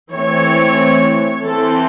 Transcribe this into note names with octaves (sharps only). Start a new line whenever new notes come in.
E3 A3 C4 C#5
E3 C4 A4